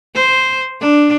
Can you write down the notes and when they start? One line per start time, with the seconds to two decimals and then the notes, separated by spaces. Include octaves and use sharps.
0.14 C5
0.81 D4